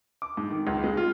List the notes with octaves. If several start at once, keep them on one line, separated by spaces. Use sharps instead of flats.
D6
G#2
D#3
C#2
G#3
F4